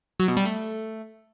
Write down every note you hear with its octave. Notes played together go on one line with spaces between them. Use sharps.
F#3
B2
G3
A3